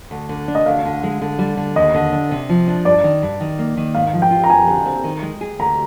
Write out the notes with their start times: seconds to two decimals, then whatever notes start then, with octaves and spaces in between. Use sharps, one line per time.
0.11 D2
0.29 D3
0.48 D4
0.55 D#5
0.66 D2 F5
0.85 D3
1.03 G#3
1.21 D3
1.39 G3
1.57 D3
1.76 D#2 D#5
1.94 D3
2.12 D4
2.31 C3
2.49 F3
2.68 D4
2.85 G2 D5
3.04 D#3
3.22 G2
3.40 D#3
3.59 A#3
3.77 D#3
3.94 G#2 F5
4.13 F3
4.22 G5
4.31 F4
4.44 A#5
4.50 F2 G#5
4.67 D3
4.86 C4
5.04 D#3
5.22 G#3
5.41 G#4
5.59 D2 A#5